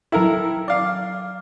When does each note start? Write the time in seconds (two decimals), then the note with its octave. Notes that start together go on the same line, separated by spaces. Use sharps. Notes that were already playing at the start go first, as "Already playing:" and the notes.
0.12 F#3 E4 A4 A#4 G5
0.68 D5 F5 D6 F6